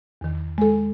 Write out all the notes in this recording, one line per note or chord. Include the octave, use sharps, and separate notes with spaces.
E2 D#3
G#3 A4